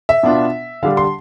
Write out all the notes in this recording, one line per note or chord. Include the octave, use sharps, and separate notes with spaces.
E5
B2 B3 D4 F4
D3 G3 D4 F5
C6